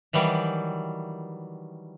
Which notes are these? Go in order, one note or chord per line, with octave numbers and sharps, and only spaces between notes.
D#3 E3 F#3 G3